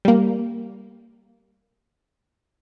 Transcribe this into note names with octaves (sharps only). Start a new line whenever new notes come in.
G3 A#3